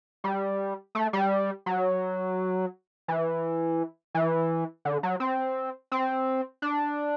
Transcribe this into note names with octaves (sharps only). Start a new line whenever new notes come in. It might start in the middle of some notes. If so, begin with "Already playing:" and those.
G3
A3
G3
F#3
E3
E3
D3
F#3
C4
C4
D4